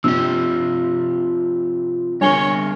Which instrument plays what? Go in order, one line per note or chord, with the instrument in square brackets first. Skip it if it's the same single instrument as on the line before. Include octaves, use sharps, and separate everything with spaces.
[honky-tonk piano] G2 C3 [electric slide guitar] F3 G4 [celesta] E6
[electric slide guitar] G3 G#4 A#4 [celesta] D4 G#5 G7 [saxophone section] C#5